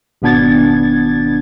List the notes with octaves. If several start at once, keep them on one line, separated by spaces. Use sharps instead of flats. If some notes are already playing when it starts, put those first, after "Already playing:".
G#1 B2 B3 D4 G#6 A6